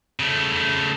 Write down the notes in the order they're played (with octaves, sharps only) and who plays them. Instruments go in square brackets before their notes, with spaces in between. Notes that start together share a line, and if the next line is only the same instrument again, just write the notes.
[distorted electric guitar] C#3 A3